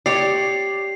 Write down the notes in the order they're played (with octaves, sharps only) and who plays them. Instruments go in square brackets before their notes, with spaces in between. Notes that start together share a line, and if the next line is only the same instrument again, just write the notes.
[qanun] G4 C#5 [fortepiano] D5 [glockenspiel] C7